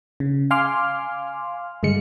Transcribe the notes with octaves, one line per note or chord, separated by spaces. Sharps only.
C#3
F5 G#5 C6 D6 F6
G2 D3 G#3 C#7